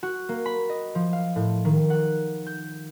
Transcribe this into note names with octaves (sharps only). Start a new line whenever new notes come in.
F#4
A#3
B5
D#5
F3
F5
A2
D#3
F#5
G6